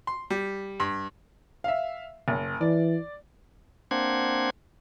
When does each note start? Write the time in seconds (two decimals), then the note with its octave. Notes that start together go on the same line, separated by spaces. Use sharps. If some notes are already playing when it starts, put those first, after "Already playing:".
0.07 C6
0.30 G3
0.80 G2
1.64 E5 F5
2.28 F#1
2.61 E3 D5
3.91 A#3 C4 D4 C5 F#5 G#6